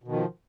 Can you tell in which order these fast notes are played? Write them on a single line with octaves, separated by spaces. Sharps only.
B2 D#3 F3